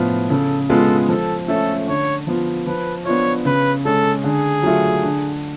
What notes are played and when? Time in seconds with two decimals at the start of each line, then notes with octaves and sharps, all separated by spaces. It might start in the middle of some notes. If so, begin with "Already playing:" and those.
Already playing: A2 F3 B3 F4
0.30 C#3 A4
0.69 G#3 B3 F4 A4
1.09 F3 A4
1.48 A3 C#4 A4
1.87 D3 C#5
2.27 F3 B3 F4
2.67 F3 B4
3.05 B3 D4 F4 C#5
3.45 C#3 B4
3.85 G#3 C#4 A4
4.24 D3 G#4
4.63 F#3 A3 F4
5.03 D3